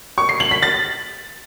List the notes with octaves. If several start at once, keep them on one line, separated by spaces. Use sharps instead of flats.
C#6
C7
F#7
B6
A6